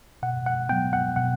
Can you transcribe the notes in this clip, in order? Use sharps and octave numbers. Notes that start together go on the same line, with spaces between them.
B2 F#5
F#5
F#3 B3 G5
F#5
B2 F#5